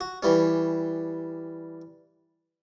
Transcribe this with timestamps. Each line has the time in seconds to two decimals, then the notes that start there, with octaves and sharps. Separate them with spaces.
0.01 F#4
0.23 E3 G3 C#4